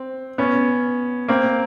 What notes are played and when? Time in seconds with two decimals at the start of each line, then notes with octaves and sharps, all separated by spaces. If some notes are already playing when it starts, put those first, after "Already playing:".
Already playing: C4
0.38 B3 C#4
1.28 A#3 C4